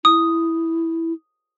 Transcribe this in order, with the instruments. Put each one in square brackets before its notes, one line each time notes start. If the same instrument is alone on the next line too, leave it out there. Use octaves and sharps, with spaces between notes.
[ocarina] E4 [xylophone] D#6